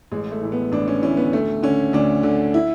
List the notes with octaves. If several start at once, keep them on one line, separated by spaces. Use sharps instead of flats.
A1 G#3
A3
A2 E3
B3
A1 D4
C#4
A2 E3 C#4
B3
D2 A3
D3 C#4
D2 D4
D3
E4